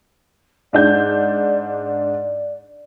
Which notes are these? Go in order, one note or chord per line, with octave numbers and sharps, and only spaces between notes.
G#2 D4 D5 G6